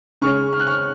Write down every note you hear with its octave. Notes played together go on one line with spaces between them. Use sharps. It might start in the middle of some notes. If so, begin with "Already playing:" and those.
C#3 G#3 C#4 C#6 F6
F6
F#6
C#6 F6